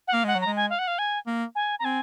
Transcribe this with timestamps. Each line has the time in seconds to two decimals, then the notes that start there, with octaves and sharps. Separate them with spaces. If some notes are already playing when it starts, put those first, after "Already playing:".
0.08 F#5
0.13 A#3 F5
0.24 G#3 F#5
0.35 F#3
0.41 A#5
0.46 G#3
0.56 G#5
0.70 F5
0.79 F#5
0.87 F5
0.98 G#5
1.27 A#3
1.55 G#5
1.79 A#5
1.84 C4 G#5